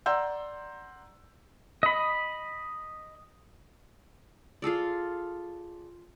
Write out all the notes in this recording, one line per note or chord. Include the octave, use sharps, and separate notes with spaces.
D5 F#5 A#5 C6 E6 G6
D#5 B5
F4 G#4 A4 D5